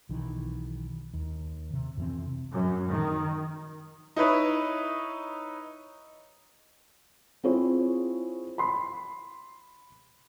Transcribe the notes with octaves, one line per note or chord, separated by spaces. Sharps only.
B1 D#3 E3
D#2
C3
F2 C3 E3 C4
F#2
D#3
D#4 E4 B4 C#5
C4 E4 F4 G#4 C5 C#5
B5 C6